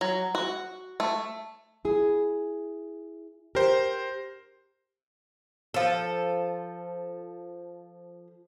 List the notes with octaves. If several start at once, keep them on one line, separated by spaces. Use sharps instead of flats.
F#3
F#4
A3
E4 G#4
G4 A#4 C5
F3 A4